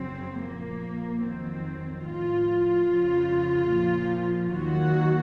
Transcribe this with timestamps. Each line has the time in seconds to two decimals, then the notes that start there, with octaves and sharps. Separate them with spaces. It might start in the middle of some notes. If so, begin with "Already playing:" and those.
Already playing: F#2 C#3 F#3 C4
0.40 A#2 F3 A#3
1.22 F2 D#3 F#3 C4
2.05 A2 F3 F4
2.87 F2 C#3 F3
3.70 A#2 F3
4.52 D#2 D#3 F#3 F#4